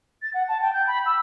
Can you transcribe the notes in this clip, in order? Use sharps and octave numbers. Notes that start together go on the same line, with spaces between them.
A6
F#5
A5
G5
G6
B5
E6